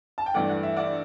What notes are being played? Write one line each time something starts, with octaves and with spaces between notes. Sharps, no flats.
A5
G5
G2 E3 A3 D5 F#5
F#5
E5
D5 F#5